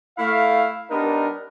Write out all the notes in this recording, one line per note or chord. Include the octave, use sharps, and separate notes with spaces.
A3 E4 F5
G3 B3 D4 D#4 A#4